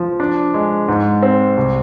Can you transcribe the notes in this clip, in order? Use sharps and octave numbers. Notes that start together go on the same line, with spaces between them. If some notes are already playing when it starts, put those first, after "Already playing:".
Already playing: F3
D4
G#3
G#2
C4
C2